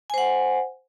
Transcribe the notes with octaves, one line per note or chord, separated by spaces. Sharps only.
C5 F#5 G#5